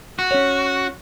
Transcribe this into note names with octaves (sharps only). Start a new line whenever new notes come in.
F#4
C#4 C#5